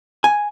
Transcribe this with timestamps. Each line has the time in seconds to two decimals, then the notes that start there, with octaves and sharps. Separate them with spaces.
0.24 G#5